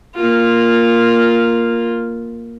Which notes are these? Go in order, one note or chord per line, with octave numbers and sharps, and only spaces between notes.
A#3 F4